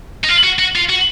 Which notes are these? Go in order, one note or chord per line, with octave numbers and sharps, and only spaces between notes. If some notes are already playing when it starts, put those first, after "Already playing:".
D#4
F4
F#4
F#4
F4
F#4